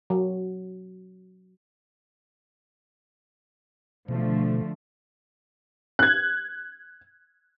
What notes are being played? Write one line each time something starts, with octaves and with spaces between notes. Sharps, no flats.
F#3
B2 D3 F3 A3
F#6 G#6